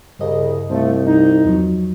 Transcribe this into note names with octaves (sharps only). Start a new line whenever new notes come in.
C2 G2 C#3 D#5
C2 F3 A3
D#4
E2 F3 F#3